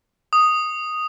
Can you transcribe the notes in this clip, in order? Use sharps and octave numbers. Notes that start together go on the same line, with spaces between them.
D#6